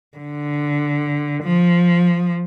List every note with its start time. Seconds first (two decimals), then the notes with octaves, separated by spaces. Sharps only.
0.18 D3
1.43 F3